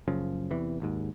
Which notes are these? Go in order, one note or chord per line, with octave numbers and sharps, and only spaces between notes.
F#1 F#2 C#3 F3
E2 C3 E3
G#1 D#2 G#2